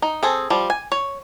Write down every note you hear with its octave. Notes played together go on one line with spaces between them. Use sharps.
D#4
C4 G#4 A4
F3 G3
G#5
C#5